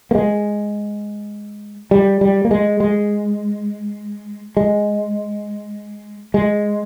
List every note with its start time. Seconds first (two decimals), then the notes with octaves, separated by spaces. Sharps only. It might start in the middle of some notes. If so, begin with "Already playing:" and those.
0.11 A#3
0.15 G#3
1.91 G3
2.21 G3
2.45 A#3
2.51 G#3
2.80 G#3
4.57 G#3
6.34 G#3